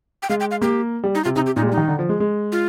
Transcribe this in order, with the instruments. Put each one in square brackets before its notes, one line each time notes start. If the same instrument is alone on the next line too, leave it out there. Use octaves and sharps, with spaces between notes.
[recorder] G5
[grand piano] G#3 [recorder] F5
[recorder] G5
F5
[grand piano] A#3 [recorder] G4
[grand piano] G3
[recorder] D#4
[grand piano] C3 [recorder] F4
[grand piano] C3 [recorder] D#4
[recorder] G4
[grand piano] A#2 [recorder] D#4
[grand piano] G#3
[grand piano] G3 [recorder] D#4
[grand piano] D#3
D3
F3
G#3
G#3
[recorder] F4